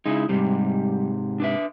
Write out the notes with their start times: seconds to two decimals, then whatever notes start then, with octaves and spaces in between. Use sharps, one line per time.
0.06 C#3 G#3 D#4 E4
0.29 G#2 C3 G3
1.40 D4 B4 E5